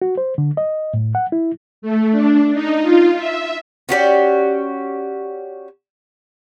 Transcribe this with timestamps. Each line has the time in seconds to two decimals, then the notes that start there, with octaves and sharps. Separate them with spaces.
0.02 F#4
0.17 C5
0.38 D3
0.57 D#5
0.94 A2
1.15 F#5
1.32 E4
1.82 A3
2.11 D4
2.54 D#4
2.82 F4
3.16 E5
3.89 C#4 F#4 G4 D5